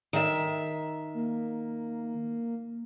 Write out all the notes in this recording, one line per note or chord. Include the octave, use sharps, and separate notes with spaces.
D#3 E5
A#3